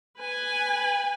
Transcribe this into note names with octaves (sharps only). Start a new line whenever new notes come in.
B4 G#5